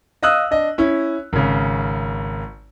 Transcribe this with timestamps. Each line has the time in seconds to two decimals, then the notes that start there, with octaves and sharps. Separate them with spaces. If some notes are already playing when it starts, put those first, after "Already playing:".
0.23 D#5 F5 D#6 E6 F#6
0.51 D4 D#5
0.78 C#4 E4
1.33 G#1 C#3